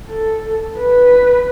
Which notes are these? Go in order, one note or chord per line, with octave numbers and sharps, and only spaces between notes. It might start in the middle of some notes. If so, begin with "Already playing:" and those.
A4
B4